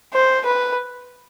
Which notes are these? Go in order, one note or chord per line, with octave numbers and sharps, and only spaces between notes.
C5
B4